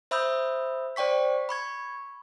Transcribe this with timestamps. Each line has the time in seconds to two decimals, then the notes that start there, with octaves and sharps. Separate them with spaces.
0.11 C5 E5 B5 D#6 E6 G6
0.96 C5 D5 G5 C#6 B6
1.49 B5 C#6 G#6